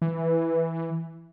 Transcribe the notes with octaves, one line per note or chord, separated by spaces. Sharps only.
E3